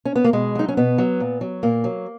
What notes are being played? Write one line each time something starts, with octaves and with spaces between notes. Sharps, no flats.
C#4
B3
A#3
B2 G#3
F#3 D#4
C#4
B2 B3
F#3
A#2
F#3
A#2 A#3
F#3